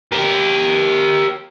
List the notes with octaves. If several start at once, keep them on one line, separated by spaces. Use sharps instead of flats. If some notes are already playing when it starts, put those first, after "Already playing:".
G4 A#4